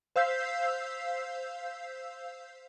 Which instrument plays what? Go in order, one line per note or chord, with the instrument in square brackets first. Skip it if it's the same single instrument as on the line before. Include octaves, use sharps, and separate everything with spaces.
[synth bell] C5 F5 E6 G6 B6 C7